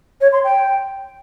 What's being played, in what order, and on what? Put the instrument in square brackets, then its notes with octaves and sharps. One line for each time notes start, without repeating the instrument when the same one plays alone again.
[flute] C#5
C6
G5